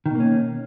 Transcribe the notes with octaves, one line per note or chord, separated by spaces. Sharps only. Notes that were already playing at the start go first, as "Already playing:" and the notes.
B2 D#3 A#3 C#4